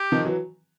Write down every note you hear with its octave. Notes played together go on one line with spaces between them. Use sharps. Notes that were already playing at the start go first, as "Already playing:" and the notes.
Already playing: G4
D#3 F3
E3 F#3